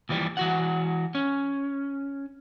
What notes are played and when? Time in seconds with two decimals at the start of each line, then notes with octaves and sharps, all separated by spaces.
0.09 D#2 E3 F3 G3
0.37 E3 F#4 F#5
1.15 C#4